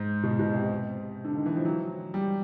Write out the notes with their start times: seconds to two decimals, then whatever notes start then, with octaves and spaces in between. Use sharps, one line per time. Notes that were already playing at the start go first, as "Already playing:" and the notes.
Already playing: G#2
0.23 B2
0.39 B2
0.54 C3
1.24 D3
1.35 D#3
1.46 E3
1.56 F3
1.65 F#3
2.14 G3